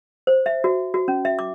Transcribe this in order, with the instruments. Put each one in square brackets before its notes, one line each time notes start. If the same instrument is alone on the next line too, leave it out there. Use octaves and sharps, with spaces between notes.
[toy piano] C5
E5
F#4
F#4
C#4
E5
D6